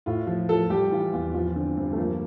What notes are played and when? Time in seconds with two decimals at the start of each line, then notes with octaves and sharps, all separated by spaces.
0.06 A2 F4
0.27 F3
0.49 F3 A4
0.70 G3 G4
0.91 E3 F4
1.13 E2 F4
1.34 F3 F4
1.56 D3 C4
1.77 G2 C4
1.93 A3
1.98 F3 A#3